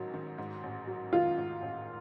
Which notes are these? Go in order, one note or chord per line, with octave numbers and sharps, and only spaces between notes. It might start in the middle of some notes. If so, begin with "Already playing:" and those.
Already playing: A1 G#2 D#3 F#3
D#3
G#2
A1
F#3
D#3 F4
G#2
A1